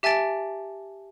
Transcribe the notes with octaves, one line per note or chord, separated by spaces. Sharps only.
G4 E5 G#5 A5 A6 D7